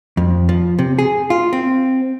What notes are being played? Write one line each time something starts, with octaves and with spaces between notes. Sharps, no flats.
F2
F3
C3
G#4
F4
C4